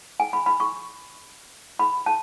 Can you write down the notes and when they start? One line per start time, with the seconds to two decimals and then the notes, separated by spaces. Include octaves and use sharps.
0.20 G#5
0.33 B5
0.46 B5
0.60 C#6
1.79 B5
2.06 A5